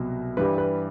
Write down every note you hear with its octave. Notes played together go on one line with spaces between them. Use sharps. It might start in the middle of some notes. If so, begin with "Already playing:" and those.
Already playing: C2 B2 F#3
G2 E3 G3 B4
B4